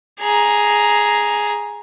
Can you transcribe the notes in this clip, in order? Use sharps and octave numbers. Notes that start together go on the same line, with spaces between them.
G#4 A#5